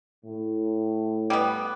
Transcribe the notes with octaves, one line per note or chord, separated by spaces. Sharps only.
A2
G3 B3